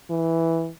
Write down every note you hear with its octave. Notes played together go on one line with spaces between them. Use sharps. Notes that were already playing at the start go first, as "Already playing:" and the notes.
E3